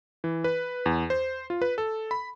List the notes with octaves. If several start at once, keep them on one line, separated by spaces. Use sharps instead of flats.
E3
B4
E2
C5
F4
B4
A4
B5